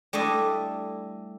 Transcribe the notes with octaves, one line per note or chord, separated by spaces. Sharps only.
G3 A3 D4 E4 D#5